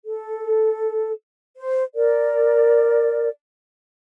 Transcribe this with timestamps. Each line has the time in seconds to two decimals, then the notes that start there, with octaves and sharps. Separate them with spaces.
0.04 A4
1.56 C5
1.94 A#4 D5